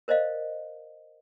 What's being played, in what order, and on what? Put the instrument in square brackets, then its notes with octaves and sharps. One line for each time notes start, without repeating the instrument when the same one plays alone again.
[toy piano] A#4 C5 D5 D#5 F5